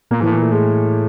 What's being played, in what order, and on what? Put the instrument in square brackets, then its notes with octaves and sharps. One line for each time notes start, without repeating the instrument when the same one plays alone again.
[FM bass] A#2 [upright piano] A#3
[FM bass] G#2 [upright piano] E3
[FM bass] A2
[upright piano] E3
[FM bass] A#2 [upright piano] A3
[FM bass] A2 [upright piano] G#3